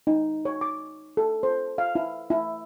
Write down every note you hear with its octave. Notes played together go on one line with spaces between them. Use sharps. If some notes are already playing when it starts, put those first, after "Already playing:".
D#4
C#5
D6
A4
C5
F5
E4
E4